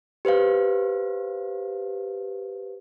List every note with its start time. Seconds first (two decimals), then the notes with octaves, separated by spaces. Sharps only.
0.25 G4 B4 C5 F5